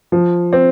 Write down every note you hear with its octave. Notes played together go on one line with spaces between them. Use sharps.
F3
C4